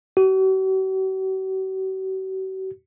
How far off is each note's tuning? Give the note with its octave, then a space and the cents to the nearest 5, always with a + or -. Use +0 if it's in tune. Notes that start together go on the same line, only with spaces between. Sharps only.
F#4 +45